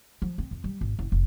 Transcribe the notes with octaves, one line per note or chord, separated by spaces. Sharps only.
F3
C4
F2
G3
G#1
F#1
F1